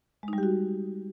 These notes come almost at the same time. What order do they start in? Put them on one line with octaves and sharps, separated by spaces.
G#3 D#4 G3 G4 F#4